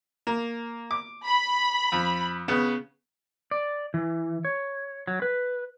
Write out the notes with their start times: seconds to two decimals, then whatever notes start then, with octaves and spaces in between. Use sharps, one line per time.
0.27 A#3
0.91 D6
1.25 B5
1.92 F2
2.48 C#3 B3
3.51 D5
3.94 E3
4.45 C#5
5.07 F#3
5.22 B4